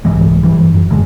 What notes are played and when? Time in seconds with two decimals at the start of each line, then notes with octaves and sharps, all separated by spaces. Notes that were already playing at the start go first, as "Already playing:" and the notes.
0.05 C2 G#2 E3 G#3
0.43 G2 E3
0.74 F#2
0.90 A1 D3 G#3